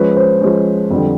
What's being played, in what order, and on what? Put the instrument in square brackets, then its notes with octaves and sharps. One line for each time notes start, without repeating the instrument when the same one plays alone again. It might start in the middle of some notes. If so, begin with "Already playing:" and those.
Already playing: [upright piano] F3 G#3 C#4 [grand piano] B4
[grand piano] C5
[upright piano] F3 G#3 C#4
F2 D3 G3